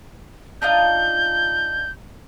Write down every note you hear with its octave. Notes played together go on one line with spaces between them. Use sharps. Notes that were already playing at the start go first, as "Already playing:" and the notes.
D4 D#4 F4 G6